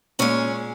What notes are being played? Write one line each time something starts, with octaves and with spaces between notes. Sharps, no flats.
A#2 G#3 C#4 C#5